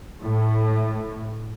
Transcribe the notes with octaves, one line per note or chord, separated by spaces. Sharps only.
A2